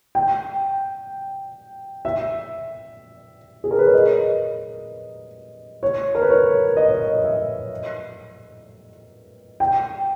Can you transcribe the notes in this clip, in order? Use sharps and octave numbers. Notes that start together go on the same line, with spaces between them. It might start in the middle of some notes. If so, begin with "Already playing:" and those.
G5
E5
G#4
A#4
B4
C#5
D#5
C#5
A#4
B4
C#5
D#5
C#5
D#5
E5
G5